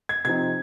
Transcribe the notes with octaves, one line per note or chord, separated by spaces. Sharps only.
G#6
C3 F3 C4 D#4 G#6